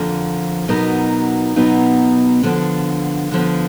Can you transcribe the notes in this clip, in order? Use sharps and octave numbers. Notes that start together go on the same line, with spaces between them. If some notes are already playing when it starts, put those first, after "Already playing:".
Already playing: F2 D3 F3 A#3
B2 F#3 B3 D#4 A#4
B2 F#3 B3 D#4 A#4
D3 F3 B3
D3 F3 B3